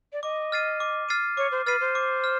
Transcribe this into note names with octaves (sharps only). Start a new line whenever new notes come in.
D5
D#5 D6
F6 A6 C7 D#7
D6
F6 A6 C7 D#7
C#5 D6
C5
B4 F6 A6 C7 D#7
C5
D6
F6